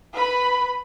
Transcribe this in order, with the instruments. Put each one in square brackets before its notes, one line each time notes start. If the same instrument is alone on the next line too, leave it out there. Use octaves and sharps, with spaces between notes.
[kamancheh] B4 B5